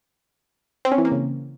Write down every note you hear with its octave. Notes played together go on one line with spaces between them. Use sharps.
C4
C#4
E3
A#3
C#3